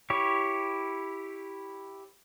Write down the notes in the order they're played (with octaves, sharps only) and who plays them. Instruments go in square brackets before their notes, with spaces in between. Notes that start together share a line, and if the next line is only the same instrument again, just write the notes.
[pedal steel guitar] E4 G4 C#5